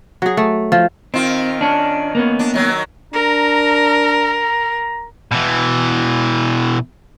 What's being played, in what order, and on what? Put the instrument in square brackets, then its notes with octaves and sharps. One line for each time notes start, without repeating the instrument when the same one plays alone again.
[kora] F#3 G#4
A3
F3
[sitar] D#3 F4 [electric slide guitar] C4
[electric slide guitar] C#4 D4
A#3 B3 C#4
[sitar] D4
D#3 F#3
[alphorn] D4 [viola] A#4 [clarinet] A#5
[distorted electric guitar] B2 E3